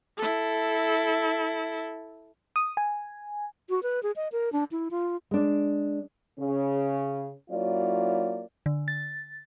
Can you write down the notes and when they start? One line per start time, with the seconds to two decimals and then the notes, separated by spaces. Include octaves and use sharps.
0.17 E4 A4
2.56 D#6
2.77 G#5
3.70 F#4
3.83 B4
4.03 G#4
4.16 D#5
4.32 A#4
4.52 D4
4.71 E4
4.91 F4
5.31 G#3 D4
6.40 C#3 C#4
7.50 F#3 A#3 C#4 E4 F4 D5
8.66 D3
8.88 A6